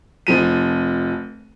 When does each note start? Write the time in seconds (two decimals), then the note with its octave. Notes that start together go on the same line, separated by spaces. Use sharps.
0.27 F1 F3 D#7